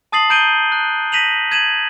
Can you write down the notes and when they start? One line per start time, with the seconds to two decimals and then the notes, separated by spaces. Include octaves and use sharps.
0.12 A5 D#6 A6 C7 F#7
0.30 A#5 G6 D7 D#7 G7
0.72 F#6
1.12 A#6 B6 D#7 F7 F#7
1.52 G#6 D#7 E7 F#7